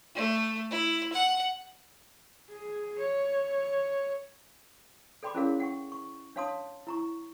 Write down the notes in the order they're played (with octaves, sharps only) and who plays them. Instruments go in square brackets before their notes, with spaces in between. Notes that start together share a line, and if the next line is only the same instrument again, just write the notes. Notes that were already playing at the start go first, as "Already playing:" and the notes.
[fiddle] A3
E4
F#5
[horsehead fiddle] G#4
C#5
[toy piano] A4 D5 G5 B5 C6 D6
C#4 E4 G#4 A#4 C#5 F5
F#5 G5 C#6
C#6
D4 C#5 F5 A5 C6 D#6
E4 A#5 C#6